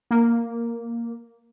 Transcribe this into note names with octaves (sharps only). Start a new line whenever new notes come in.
A#3